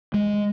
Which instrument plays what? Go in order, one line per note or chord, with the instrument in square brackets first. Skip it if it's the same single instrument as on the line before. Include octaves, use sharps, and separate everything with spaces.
[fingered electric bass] G#3